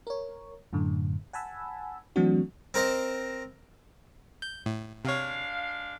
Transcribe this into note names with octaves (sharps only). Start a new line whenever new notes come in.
A#4 C#5
F#2 A2 D3
F#5 G#5 A5 B5 E6
E3 F#3 A3 C4 D4 F#4
C4 A#4 C5 D#5
G6
A2
C3 G#3 D4 C#5 F5